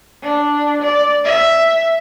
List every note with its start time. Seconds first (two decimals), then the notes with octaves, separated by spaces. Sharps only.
0.23 D4
0.82 D5
1.24 E5